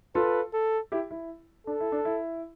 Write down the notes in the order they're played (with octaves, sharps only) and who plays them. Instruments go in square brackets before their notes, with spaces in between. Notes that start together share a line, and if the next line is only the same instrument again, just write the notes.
[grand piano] F4 A4 [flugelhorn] B4
[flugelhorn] A4
[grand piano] E4 G4
E4
[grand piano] D4 [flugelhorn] A4
[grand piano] E4
D4
E4